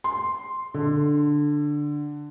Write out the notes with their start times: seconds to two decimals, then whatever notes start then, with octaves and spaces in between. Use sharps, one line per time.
0.04 C6
0.74 D3